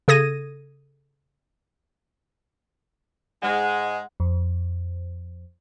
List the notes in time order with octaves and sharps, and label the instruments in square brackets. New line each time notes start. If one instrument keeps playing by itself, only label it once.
[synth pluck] C#3 A4 D#6 G#6 A#6 D#7
[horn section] G#2 G#3 [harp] F#5
[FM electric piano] F2